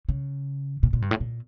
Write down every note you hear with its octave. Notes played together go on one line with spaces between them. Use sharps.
C#3
A#2
A#2
G2
A2
A#2